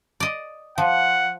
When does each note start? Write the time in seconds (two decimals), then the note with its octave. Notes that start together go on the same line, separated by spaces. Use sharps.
0.20 D5 D#5
0.78 F3 F#5